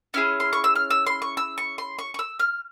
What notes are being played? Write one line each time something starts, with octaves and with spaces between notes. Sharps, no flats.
C#4 E4 G#4 F6
C6
C#6
E6
F6
E6
C6
C#6
E6
C#6
C6
C#6
C#6
E6
F6